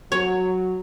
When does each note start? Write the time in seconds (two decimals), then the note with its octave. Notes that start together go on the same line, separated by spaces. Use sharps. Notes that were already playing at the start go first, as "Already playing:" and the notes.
0.12 F#3 C#5